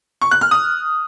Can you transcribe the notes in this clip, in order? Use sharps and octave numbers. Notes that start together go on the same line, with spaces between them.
C#6
F#6
F6
D#6